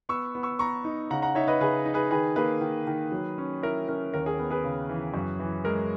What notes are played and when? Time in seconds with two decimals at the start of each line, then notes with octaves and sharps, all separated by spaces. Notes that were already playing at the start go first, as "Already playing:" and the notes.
0.09 B3 C#6 E6
0.35 B3
0.43 C#6 E6
0.59 B3 A#5 C#6
0.85 D#4
1.11 C#3 F#5 A#5
1.22 F#5 A#5
1.35 D#4 C#5 E5
1.48 B4 D#5
1.60 C#3 G#4 B4
1.85 D#4
1.94 G#4 B4
2.11 D#3 G#4 B4
2.36 A#3 G#4 B4
2.61 D#3
2.87 D#3
3.12 F#3
3.38 C#4
3.63 E4 A#4
3.88 C#4 A#4
4.14 D#2 A#4
4.26 G#4
4.39 B3
4.51 G#4 B4
4.64 C#3
4.89 E3
5.14 F#2
5.39 E3
5.64 G#3 A#4